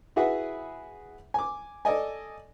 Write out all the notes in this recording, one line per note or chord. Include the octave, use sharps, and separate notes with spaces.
E4 F#4 G#4 B4 E5 F#5
G#5 D6
A4 D5 D#5 G#5